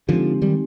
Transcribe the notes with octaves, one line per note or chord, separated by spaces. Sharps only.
D3 F3 G#3 C4 D#4 G4
D#3 G3